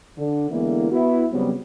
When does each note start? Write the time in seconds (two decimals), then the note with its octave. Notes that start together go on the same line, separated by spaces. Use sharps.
0.18 D3
0.50 D3 E3 G#3 A#3 B3 E4
0.92 B3 E4 F#4
1.33 C#3 F#3 G3 B3 C4